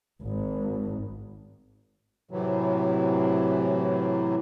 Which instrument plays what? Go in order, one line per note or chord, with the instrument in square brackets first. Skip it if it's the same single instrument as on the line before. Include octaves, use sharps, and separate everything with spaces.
[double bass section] G#1
[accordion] A2 C3 E3 F#3